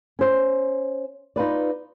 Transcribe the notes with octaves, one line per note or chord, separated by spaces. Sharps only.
C#4 C5
D#4 F4 B4 D5